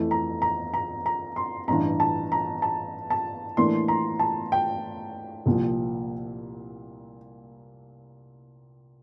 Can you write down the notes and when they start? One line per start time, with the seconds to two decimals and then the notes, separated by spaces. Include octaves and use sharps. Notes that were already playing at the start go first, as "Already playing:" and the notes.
Already playing: F2 E3 A3 E4
0.11 A#5
0.42 A#5
0.74 A#5
1.06 A#5
1.36 C6
1.68 A1 G2 E3 A#5
2.00 A5
2.32 A#5
2.62 A5
3.10 A5
3.57 A2 E3 A#3 D4 C6
3.88 A#5
4.19 A5
4.52 G5
5.46 C2 A#2 F3